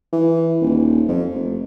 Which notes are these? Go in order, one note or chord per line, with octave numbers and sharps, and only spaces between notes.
E3
D#1
F2
F1